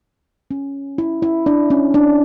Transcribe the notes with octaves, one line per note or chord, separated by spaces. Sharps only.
C#4
E4
E4
D4
C#4
D4